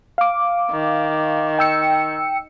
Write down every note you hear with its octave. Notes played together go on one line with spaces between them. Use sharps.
F5 D6
D#3
G5 E6 C#7